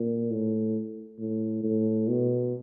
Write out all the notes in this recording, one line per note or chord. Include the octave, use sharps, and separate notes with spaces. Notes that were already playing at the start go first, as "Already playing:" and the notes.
Already playing: A#2
A2
A2
A2
B2